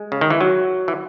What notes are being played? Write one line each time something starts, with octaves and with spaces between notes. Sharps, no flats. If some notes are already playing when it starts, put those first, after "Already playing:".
Already playing: G#3
C#3
D#3
E3
F#3
E3